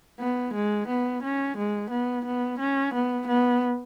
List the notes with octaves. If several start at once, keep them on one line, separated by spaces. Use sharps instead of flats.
B3
G#3
B3
C#4
G#3
B3
B3
C#4
B3
B3